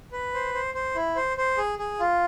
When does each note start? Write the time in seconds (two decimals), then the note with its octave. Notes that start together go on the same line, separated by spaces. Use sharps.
0.12 B4
0.34 C5
0.54 C5
0.74 C5
0.95 E4
1.16 C5
1.37 C5
1.57 G#4
1.79 G#4
2.00 F4